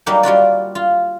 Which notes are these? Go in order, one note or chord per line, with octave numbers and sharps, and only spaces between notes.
F#3 G3 A#3 D#4 G4 F#5
G3 F4 F#4 D5
F4